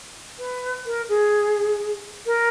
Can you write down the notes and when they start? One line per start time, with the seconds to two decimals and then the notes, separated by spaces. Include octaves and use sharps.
0.38 B4
0.85 A#4
1.08 G#4
2.25 A#4